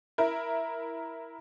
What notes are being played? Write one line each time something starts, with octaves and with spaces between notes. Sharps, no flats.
E4 A#4